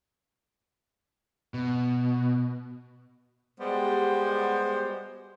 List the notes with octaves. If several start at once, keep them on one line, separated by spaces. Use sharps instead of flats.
B2
G3 G#3 B3 F#4 G4 C5